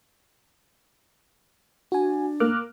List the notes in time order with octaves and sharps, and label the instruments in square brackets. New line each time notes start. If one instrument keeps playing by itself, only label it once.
[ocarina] D4 [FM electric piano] F#4 G#5
[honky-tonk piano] A#3 [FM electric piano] D6 F6 F#6